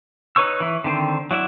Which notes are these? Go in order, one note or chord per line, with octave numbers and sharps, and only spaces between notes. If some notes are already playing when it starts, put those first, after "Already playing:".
D#4 B4 C#5 C#6 E6
E3 E4
D3 D#3 C4 C5
F#3 E4 D5 E5